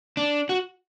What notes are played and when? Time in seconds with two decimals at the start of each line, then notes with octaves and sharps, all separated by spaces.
0.17 D4
0.49 F#4